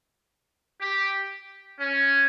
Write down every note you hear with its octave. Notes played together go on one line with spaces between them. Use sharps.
G4
C#4